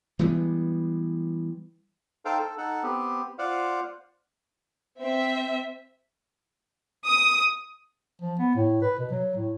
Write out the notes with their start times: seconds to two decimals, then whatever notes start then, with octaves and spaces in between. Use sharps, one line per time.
0.19 E3 G3 G#3 B3
2.25 D#4 A4 C5 F5 G5
2.40 A4
2.58 D#4 A4 F#5
2.83 B3 C4 G4
3.38 F4 C5 D5 F5 F#5
5.02 C4 E5
7.06 D#6
8.22 F3
8.39 B3
8.55 A2
8.82 B4
8.98 B2
9.10 F#3
9.35 A2